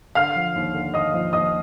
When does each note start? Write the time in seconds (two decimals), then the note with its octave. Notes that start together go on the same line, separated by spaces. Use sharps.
0.15 D3 F5 F6
0.36 F3
0.55 D#2
0.74 D3
0.94 D#2 D#5 D#6
1.14 F3
1.33 D#2 D#5 D#6